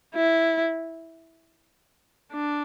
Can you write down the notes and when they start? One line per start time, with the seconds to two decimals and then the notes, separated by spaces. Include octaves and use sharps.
0.15 E4
2.33 D4